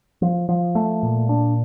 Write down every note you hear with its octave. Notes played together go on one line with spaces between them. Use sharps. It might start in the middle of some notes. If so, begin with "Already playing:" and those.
F3
F3
A3
A#2
D4